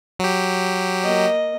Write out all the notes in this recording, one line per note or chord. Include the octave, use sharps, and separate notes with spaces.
F#3 G4
A#3 D#5